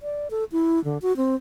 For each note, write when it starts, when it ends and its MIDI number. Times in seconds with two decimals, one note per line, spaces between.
0.01 0.28 74
0.31 0.44 69
0.52 0.82 64
0.84 0.98 50
1.02 1.16 66
1.17 1.35 60